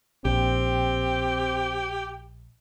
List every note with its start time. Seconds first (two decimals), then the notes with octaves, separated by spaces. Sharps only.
0.25 A#1 C4 G4